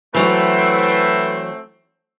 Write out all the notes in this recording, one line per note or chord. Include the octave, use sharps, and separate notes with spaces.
E3 F#3 A3 C4 F#4 B4